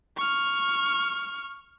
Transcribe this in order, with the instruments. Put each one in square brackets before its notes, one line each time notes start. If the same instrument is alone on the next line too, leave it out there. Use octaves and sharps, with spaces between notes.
[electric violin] C#6 F6